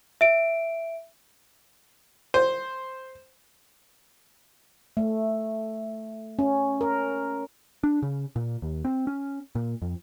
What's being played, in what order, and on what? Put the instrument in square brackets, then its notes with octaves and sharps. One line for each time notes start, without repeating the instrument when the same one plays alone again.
[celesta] E5 D7
[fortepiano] C5
[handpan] A3
C#4
A#4
[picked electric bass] D4
C#3
A#2
D#2
C4
C#4
A#2
F2